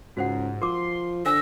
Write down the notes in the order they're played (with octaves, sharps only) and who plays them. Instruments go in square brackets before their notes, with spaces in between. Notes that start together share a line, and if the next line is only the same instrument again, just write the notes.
[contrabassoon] C#2 [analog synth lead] G#2 [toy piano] F#4 C5 F#5
[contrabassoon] F3 [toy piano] A#4 D6 [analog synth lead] C6
[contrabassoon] D3 [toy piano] C5 G#5 [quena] E6 [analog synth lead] A#6